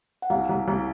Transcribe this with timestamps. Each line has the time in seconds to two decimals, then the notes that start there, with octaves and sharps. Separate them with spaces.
0.22 F#5
0.30 C2 F5
0.49 C2
0.68 C2